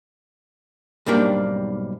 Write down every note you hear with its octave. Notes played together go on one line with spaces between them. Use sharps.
B1 G#2 G3 A#3 D4 G5